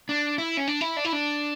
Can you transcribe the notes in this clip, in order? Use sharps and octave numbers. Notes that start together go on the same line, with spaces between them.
D4
E4
C#4
D4
E4
D4
E4
D4